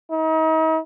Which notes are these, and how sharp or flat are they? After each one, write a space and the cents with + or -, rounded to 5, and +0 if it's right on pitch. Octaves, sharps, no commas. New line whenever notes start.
D#4 +40